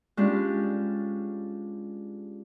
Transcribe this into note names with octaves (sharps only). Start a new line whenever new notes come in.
G#3 C#4 D4 F4 G4